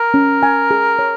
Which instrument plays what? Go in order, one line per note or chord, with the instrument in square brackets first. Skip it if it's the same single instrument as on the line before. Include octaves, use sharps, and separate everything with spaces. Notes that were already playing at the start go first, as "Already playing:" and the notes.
Already playing: [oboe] A#4
[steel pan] C#4
G#5
G#4
C#5